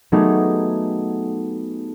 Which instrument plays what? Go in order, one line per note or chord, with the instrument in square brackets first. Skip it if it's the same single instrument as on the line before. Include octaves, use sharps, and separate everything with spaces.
[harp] F#3 A3 B3 D#4 G4 G#4